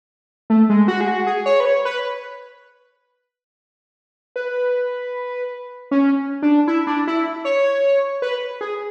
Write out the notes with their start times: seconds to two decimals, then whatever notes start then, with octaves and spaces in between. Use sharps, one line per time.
0.50 A3
0.70 G#3
0.88 F#4
1.01 G#4
1.08 F#4
1.27 G#4
1.46 C#5
1.60 B4
1.65 C#5
1.85 B4
4.36 B4
5.91 C#4
6.42 D4
6.68 E4
6.87 D4
7.07 E4
7.45 C#5
8.22 B4
8.61 G#4